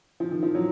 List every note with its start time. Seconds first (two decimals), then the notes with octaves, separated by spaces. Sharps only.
0.20 F3
0.31 D#3
0.43 F3
0.55 F#3